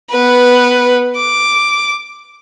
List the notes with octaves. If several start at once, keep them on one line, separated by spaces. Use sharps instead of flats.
B3 B4
D6